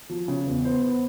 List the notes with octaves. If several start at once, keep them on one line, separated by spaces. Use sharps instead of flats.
F3
C#3
E2
B3 C5
B3